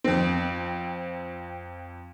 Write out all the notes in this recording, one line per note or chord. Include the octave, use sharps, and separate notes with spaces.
F2 C4